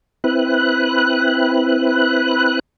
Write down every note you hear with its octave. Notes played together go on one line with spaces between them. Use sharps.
C4 E4 B4 F#6